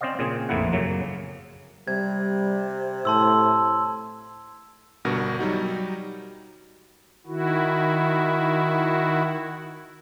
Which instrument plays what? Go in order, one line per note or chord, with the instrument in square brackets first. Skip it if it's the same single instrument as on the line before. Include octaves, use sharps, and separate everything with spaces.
[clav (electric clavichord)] C4 C#4 C5 D5 D#5 F5
A#2 C#3 C4 G#4
A#1 F2 A2 A#3 E4 F#5
F#2 C#3 F#3 A#3
[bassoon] C3 [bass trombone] G3 [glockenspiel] G#6
[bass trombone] A2 [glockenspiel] A5 C6 E6
[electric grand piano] G1 G2 B2 F#4 A#4 A#6
F#3 G3 D#4 F#4
[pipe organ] D#3 E4 F#4